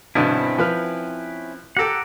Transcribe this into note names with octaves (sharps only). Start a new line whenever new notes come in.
G2 B2 D3 C4 C#4 E4
F3 B4 F6
G4 A4 F#5 A#5 D6